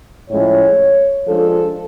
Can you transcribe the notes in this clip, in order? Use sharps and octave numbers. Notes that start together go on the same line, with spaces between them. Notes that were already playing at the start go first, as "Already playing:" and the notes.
A2 F3 G#3 C#4 C#5
F3 G#3 D4 A4